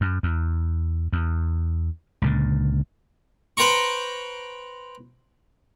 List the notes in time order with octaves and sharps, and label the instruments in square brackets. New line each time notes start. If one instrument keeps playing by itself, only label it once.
[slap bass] F#2
E2
E2
C#2 A#2 D3
[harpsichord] B4 C5 G5 A#5 C#6